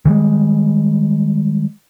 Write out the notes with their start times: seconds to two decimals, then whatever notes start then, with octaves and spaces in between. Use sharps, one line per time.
0.05 D#3 E3 G3 G#3